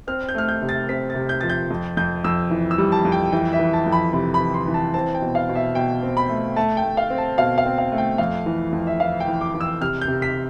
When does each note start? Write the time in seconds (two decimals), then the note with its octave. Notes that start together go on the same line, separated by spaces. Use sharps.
0.07 C4 F6
0.29 G6
0.35 A3 F6
0.48 G6
0.62 C3
0.69 A6
0.89 C4 B6
1.10 A6
1.15 C3
1.29 G6
1.41 F3 A6
1.50 G6
1.70 F2
1.97 F2 G6
2.24 F2 E6
2.51 E3
2.71 E6
2.78 G3
2.92 A5
3.05 F2
3.12 G5
3.32 E3 G5
3.53 E5
3.59 E3
3.73 A5
3.86 F2
3.92 B5
4.13 C3 B5
4.34 B5
4.40 E3
4.54 C6
4.67 E3
4.74 A5
4.94 C4 A5
5.15 G5
5.21 B2
5.35 F5
5.49 B2
5.55 E5
5.75 B2 G5
6.03 C4
6.17 B5
6.29 A3
6.56 A3 A5
6.77 G5
6.83 A3
6.97 F5
7.10 C4
7.18 A5
7.38 B2 F5
7.58 F5
7.65 C4
7.78 F5
7.92 A3
7.98 G5
8.18 F2 F5
8.46 E3
8.72 F2
8.87 E5
9.00 E3 F5
9.20 G5
9.27 E3
9.41 D6
9.54 E3
9.61 E6
9.81 C3 F6
10.01 G6
10.07 C3
10.22 B6